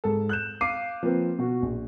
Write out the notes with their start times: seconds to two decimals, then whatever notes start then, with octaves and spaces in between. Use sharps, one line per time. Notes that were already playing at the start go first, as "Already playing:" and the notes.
0.04 G#2 A4
0.29 F#6 G6 E7
0.61 F5 D6 C7 D#7
1.03 F3 A#3 C4 B4
1.39 B2 F#4
1.62 A#1